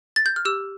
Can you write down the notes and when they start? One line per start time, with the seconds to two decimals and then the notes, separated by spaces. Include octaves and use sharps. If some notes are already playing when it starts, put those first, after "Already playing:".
0.16 A6
0.26 G6
0.36 F6
0.45 G4 E6